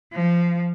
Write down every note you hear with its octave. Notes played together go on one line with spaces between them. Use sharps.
F3